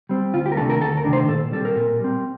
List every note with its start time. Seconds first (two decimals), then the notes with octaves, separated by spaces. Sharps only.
0.09 G3 C4
0.34 D2 F4
0.46 G4
0.52 A#4
0.57 C3 D#3 A3 D4 A4
0.70 A#4
0.81 D2 A4
0.97 A#4
1.05 C3 D#3 A3 D4
1.13 C5
1.29 A#2 A4
1.52 G3 C4 A4
1.65 A#4
1.76 A#2
2.00 G3 C4